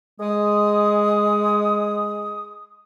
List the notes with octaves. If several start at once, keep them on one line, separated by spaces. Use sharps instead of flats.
G#3 D#6